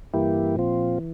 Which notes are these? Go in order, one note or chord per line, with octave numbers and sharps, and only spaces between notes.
G2 E3 A#3 E4 G4
A#2 F3 C4 F4
E3